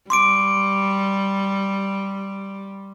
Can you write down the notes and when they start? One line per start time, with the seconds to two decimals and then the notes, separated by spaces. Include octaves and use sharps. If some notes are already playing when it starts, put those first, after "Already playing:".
0.10 G3 C6 D6 D7